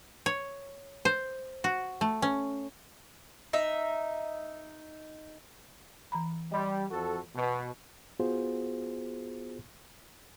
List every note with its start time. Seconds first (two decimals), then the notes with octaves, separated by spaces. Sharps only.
0.26 C#5
1.05 C5
1.64 F#4
2.01 A3
2.22 C#4
3.53 D#4 E5
6.12 E3 A#5 B5
6.52 G3 D#5 B5 C6
6.91 F2 F#4 A4
7.35 B2
8.19 B3 F4 F#4 G#4 C5